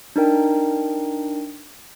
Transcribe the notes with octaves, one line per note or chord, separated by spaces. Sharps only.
D4 D#4 A#4 G5